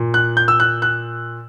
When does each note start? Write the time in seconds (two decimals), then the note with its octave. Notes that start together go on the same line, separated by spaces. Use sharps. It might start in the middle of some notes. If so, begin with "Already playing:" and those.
Already playing: A#2
0.14 F#6
0.37 G6
0.48 E6
0.60 F#6
0.82 F#6